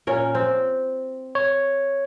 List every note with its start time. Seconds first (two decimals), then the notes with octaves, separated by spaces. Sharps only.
0.07 A#2 C#4 A#4
0.35 C4
1.35 C#5